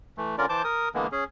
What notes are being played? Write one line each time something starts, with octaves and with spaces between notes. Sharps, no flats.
E3 A3
D3 C#4 F4 A#4 D5
E3 C5 A5 D6 G6
A#4 D#6
D3 E3 G#3 A#3 B3
C#4 G#4